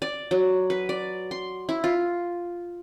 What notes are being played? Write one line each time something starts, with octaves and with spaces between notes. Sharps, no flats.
D5
F#3
B4
D5
C6
E4
F4